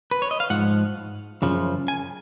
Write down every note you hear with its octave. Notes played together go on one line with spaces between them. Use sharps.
B4
C#5
D#5
F5
G#2 F3 F#5
F#2 C#3 F3
G#5